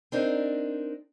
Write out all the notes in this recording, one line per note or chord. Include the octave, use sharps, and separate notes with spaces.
C4 D4 D#4 A#4